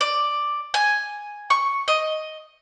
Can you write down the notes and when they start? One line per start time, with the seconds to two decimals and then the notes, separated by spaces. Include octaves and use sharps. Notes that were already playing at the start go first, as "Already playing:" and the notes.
0.01 D5
0.74 G#5
1.50 C#6
1.88 D#5